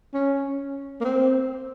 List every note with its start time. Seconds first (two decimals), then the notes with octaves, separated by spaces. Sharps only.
0.14 C#4
1.01 A#3
1.04 C4